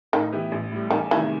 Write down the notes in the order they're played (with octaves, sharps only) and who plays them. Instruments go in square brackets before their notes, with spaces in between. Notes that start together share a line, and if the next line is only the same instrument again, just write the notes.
[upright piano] A2 [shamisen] D#3
[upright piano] E3 B3 E4 G4
A1
A2 G3
[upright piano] E2 [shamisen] D#3
[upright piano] C3 D#3 A3 [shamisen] E3